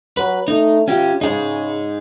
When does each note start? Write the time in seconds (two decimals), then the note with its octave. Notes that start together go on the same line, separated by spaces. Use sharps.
0.17 F#3 B4
0.48 A3 D#4
0.88 C#4 F4 G4
1.21 C#3 D#4 G#4